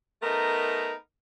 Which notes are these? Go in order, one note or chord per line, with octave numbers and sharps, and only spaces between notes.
A3 B3 D#4 A#4